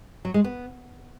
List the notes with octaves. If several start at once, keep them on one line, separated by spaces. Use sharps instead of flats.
F#3
G#3
B3